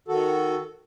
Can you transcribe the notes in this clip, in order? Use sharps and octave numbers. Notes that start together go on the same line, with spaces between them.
D#3 F#4 A4